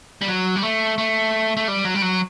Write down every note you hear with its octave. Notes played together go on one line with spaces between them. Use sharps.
G3
F#3
G3
A3
A3
A3
G3
F#3
G3
F#3